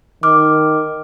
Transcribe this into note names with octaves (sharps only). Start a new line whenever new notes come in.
D#3 D6 F6